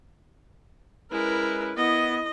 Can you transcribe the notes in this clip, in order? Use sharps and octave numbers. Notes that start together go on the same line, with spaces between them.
G#3 C#4 E4 A#4 B4
B3 E4 D#5